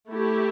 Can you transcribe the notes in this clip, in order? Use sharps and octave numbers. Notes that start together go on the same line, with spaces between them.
A3 E4 G4